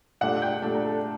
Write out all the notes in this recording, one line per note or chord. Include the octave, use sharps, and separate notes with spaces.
A#2 A3 D4 G4 F#5 F#6
G5 G6
A#2 A3 D4 G4 A5
A#5
A4 A5